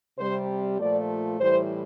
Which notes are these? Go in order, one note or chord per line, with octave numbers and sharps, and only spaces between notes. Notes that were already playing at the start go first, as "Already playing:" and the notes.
C3 G3 C5
A#2 F3 A3 D5
A2 E3 G3 C5